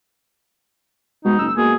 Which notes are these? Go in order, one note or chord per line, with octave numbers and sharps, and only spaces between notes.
B2 G#3 D#4
F#1 E6
B2 A#3 G#4